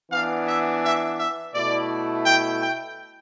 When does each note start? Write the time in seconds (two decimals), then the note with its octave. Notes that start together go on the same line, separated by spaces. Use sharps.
0.11 E3 B3 D4 F5
0.47 E5
0.83 E5
1.18 E5
1.54 B2 A3 E4 D5
2.25 G5
2.62 G5